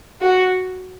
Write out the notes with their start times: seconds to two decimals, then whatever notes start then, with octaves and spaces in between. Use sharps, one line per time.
0.21 F#4